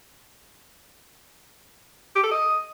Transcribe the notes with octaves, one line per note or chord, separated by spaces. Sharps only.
G4
A4
D#5